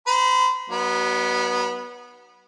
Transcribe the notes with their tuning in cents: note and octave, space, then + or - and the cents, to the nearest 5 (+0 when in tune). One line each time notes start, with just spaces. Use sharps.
C5 -35 B5 -30
F#3 +35 B3 -15 D#4 -15